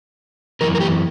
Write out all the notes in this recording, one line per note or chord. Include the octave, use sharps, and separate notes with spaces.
F#2 E3 A#4
A#4
G4